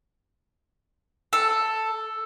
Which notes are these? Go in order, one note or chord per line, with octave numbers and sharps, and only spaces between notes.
A4